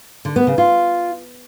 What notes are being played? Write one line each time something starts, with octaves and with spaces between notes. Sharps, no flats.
D3
B3
C#3
F4